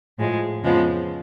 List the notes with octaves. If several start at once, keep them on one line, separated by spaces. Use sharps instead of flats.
A2 F3 G#3
F2 C#3 F3 G#3 B3